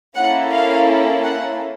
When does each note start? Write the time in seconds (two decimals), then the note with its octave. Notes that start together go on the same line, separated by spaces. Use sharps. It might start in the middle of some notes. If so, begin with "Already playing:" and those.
0.15 A#3 C#4 E4 A4 F#5
0.52 F5
1.24 F#5